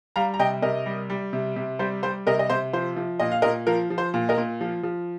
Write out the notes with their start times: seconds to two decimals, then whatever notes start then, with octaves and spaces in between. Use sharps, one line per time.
0.16 G3 F5 A#5
0.34 A#5
0.39 C3 D#5 G5
0.62 C3 A#4 D#5
0.86 G3
1.10 G3
1.33 C3
1.56 C3
1.79 G3 C5
2.03 G3 C5
2.27 C3 A#4 D#5
2.39 D#5
2.50 C3 C5
2.73 F3 C5
2.96 F3
3.20 A#2 D#5
3.32 F5
3.42 A#2 A#4 D#5
3.67 F3 A#4
3.90 F3
3.98 C5
4.14 A#2
4.29 A#4 D#5
4.37 A#2
4.61 F3
4.83 F3